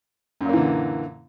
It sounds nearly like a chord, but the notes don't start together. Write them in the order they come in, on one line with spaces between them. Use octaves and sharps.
F#2 A#2 A#3 E3 D3